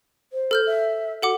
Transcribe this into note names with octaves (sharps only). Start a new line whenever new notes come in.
C5
A4 F6 G6
E5
F#4 A4 F#5 D6